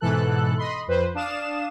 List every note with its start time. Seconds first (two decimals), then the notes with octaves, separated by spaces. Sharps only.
0.01 G#2 B2 E3 A4 F#6
0.58 D#5 B5 C6
0.88 F2 B4 C5
1.15 D4 F5 D#6 E7